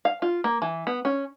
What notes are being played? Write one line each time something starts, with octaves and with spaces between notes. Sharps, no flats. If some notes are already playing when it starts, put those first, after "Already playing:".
F5
F4
A#3
E3
B3
C#4